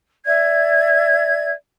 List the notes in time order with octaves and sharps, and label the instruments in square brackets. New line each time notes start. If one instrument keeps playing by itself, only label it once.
[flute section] D5 E5 G#6